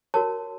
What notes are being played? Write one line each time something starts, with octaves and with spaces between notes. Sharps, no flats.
F#4 A#4 C#5 A5